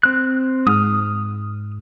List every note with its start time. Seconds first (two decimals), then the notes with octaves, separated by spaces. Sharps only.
0.03 C4 F#6
0.67 G#2 D#6 F6